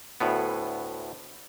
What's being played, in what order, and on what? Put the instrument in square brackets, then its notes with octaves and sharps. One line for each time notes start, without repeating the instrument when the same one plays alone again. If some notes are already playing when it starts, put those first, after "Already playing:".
[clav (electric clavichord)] D2 A2 B3